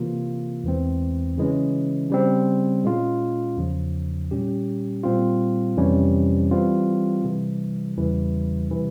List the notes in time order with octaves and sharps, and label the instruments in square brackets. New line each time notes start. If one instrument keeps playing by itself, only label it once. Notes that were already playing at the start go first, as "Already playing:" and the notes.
Already playing: [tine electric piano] C3 E3 A#3 F4
E2 E3 G#3 C4
C#3 E3 G#3 C#4
C#3 G3 C4
A#2 G#3 C#4 F4
E2 C#3 F3
A#2 G3 C#4 G4
A#2 G3 C4 F4
F2 C3 E3 G3 C#4
E3 G3 C4 F4
C3 E3 G3
E2 C#3 E3 G3
C3 E3 G3